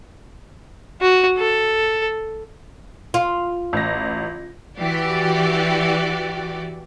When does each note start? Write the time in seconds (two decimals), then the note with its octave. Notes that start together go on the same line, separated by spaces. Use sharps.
1.02 F#4
1.38 A4
3.14 F4
3.73 A1 A#6
4.79 E3 F#4 G4 D5